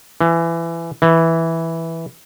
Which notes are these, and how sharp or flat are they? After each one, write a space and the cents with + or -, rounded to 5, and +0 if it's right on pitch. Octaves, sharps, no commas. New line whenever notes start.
E3 +20
E3 -5